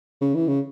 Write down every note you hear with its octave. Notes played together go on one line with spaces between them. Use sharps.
C#3
E3
C#3